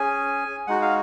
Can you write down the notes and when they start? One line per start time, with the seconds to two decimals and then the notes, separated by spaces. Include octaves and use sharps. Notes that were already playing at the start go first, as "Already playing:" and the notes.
Already playing: C#4 G#4 G#5
0.67 G#3 D#4 F#4 F#5
0.82 F5